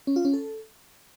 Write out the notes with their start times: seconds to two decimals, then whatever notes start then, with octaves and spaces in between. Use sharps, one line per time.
0.07 C#4
0.16 F4
0.25 C#4
0.34 A4